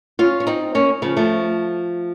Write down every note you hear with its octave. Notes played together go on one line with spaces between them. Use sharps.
C#4 F4
C#4
C4 D#4
A#3 C#4
C#3 F3
F3 A3